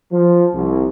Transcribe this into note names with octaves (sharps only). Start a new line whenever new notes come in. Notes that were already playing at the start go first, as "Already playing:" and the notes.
F3
C2